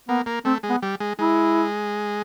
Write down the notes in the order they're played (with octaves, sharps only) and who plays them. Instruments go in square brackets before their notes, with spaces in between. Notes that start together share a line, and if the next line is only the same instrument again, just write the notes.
[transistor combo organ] A#3 [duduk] B3
[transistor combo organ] A#3
[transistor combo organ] A3 [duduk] C4
[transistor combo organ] G#3
[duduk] B3
[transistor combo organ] G3
G#3
[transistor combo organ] G#3 [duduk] E4